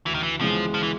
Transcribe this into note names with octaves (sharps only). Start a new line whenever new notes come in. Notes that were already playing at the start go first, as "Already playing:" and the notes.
D2 E3
D#3
E3
C#3 E3 F3 G#3 B3
F3
E3